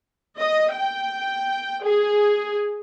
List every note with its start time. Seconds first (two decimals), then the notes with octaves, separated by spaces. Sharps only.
0.38 D#5
0.74 G5
1.85 G#4